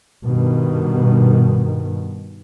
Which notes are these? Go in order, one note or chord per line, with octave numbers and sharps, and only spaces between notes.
G2 B2 D#3